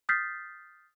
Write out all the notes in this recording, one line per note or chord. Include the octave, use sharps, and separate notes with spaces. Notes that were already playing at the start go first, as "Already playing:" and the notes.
D#6 F6 G6 A6 B6 C7